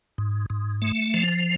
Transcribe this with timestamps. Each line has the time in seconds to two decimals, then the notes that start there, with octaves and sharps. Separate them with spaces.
0.18 G#2
0.50 G#2
0.82 A3
1.14 F3